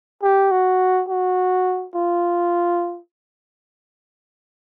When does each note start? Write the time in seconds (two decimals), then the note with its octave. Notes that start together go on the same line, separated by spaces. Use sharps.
0.23 G4
0.51 F#4
1.08 F#4
1.95 F4